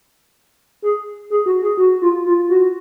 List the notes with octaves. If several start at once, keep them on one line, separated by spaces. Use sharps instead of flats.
G#4
G#4
F#4
G#4
F#4
F4
F4
F#4